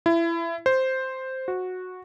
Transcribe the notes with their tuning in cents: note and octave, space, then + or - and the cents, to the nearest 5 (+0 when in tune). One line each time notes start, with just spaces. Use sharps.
E4 +25
C5 +0
F#4 -10